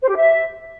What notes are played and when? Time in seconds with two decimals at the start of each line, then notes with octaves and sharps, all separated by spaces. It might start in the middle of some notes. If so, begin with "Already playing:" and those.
0.01 C5
0.09 G4
0.16 E5